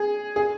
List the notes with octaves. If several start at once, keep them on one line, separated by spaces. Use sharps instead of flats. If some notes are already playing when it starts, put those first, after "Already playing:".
Already playing: G#4
G#4